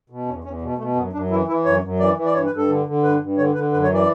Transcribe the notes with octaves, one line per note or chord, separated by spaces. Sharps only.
B2
E2 C#4
E2 C#4
B2
B2 A3
F#2 B3
F#2 D4
E3 E4
E3 E4
F#2 C#5
F#2
E3 D5
E3
D5
G2 C#5
B4
G2
A4
D3
D3
G2 B4
G2
D3 C#5
D3 B4
F#2 B4
C#5
E3
D5